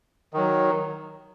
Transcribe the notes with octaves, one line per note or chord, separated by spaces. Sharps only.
D#3 F#3